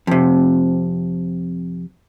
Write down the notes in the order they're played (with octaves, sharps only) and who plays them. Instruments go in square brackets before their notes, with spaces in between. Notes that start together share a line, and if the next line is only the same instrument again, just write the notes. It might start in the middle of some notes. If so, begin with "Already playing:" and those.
[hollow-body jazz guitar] F2 C3